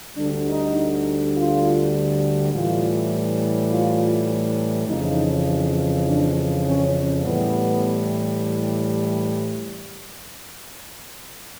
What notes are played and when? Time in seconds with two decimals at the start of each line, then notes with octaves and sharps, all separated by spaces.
0.16 D2 D3 G3 D4
0.46 D#4
1.34 F4
2.52 A2 E3 G3 F4
3.69 F4
4.87 F2 C#3 E3 D#4
6.04 D4
6.64 C#4
7.22 A2 E3 G3 B3